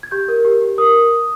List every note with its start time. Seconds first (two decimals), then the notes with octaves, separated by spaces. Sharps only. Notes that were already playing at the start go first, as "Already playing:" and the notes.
0.03 G#6
0.11 G4 G6
0.28 A#4
0.45 G4
0.61 G4
0.78 A#4 D#6